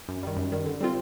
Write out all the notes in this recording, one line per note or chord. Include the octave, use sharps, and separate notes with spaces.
F#2
D#3 G3
F#2
D#3 G3
D3
G3 C4 F4